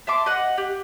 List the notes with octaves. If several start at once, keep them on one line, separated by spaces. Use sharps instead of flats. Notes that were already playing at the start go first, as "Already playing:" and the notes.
E5 A5 C6 D6
D#5 F#5
G4